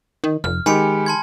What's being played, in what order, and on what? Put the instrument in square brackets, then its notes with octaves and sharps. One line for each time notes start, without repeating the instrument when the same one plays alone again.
[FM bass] D#3
[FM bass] F1 [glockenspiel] F6
[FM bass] D#3 [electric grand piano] G#3 G4 [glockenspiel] G#5 B5 C#7
[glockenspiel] A5 C6 G#6